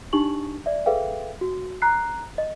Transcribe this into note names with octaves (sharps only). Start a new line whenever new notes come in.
D4 D#4 G4 C#6 F#7
D5 E5
G#4 A4 B4 E5 F5 G5
F#4
A#5 F#6 C7
D#5